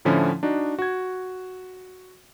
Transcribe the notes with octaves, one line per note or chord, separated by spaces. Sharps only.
A2 D3 F3 C#4 E4
D4 D#4 F#4
F#4 G#6